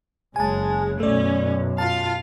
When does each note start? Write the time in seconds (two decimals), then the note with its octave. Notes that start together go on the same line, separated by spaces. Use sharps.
0.36 F#1 C#3 G#3 G#5 A5
1.00 B1 F#2 A3 C#4 D5
1.78 F4 F5 A5